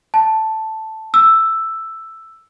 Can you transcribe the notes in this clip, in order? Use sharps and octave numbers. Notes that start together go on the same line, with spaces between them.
A5
E6